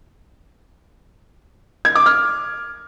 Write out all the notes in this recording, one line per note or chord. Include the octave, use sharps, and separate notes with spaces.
G#6
D6
F6